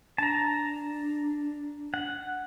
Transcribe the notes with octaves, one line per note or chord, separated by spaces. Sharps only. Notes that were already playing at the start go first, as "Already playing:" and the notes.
D4 A5 A#5
F#5